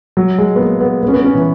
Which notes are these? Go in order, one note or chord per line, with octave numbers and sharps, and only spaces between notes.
F#3
G#3
B3
A#3
B3
B3
C#4
B3
C#4
E3